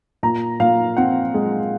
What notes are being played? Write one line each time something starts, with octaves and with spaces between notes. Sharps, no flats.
A#2 A#5
A#2 F5
C4 F#5
G#3